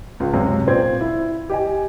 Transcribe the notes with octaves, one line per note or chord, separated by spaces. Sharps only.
C#2 F4
F#2 C3 G#3 C#4
A#2 C4 C5 D5 G#6
E4
G4 D#5 G#5